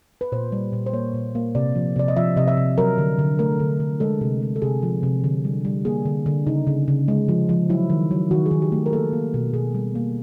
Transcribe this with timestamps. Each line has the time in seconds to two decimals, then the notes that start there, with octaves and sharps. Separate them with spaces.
0.21 B4
0.32 A#2 C5
0.52 G3
0.73 A#2
0.86 C5
0.93 A#3 C#5
1.14 A#2
1.35 A#3
1.55 C3 D5
1.75 F3
1.96 C3 D5
2.08 D#5
2.16 F3 E5
2.36 C3 D#5
2.48 E5
2.57 C3
2.78 F#3 A#4
2.98 D3
3.19 D3
3.39 A3 A#4
3.60 D3
3.80 D3
4.00 G#3 A4
4.21 C3
4.42 G#3
4.56 A4
4.62 C3 G#4
4.83 F3
5.03 C3
5.24 D3
5.45 G3
5.65 G3
5.85 A#3 G#4
6.06 D3
6.26 D3
6.47 C#3 D#4
6.67 C#3
6.88 C#3
7.08 G#3
7.28 F3
7.49 F3
7.69 F#3 E4
7.90 D#3
8.11 F#3
8.31 D#3 F#4
8.46 G#4
8.51 D#3
8.62 G4
8.72 A3
8.86 A#4
8.93 A#3 A4
9.13 A#3
9.34 B2
9.54 B2 G#4
9.75 G3
9.95 A#3